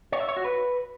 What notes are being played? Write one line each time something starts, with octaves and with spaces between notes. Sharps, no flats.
C#5
E5
C#5
F#4
B4